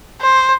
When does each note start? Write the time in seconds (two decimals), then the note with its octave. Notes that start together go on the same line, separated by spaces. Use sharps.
0.21 C5